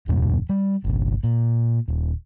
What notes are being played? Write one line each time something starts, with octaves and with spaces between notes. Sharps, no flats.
D1 E2 G2 B2
G3
G1 C2 D3
A#2
D#1